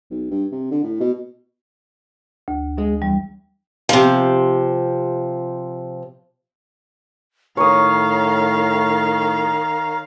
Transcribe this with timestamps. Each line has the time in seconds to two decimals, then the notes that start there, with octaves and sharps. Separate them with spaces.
0.10 B1
0.31 G2
0.52 C3
0.71 D3
0.83 A2
1.00 B2
2.48 D2
2.78 G#3
3.02 E2 G3
3.89 C3 F3
7.57 A2 D#3 C#5 F5 A#5 D#6